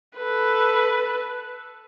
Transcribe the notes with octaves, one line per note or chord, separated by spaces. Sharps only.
A4 B4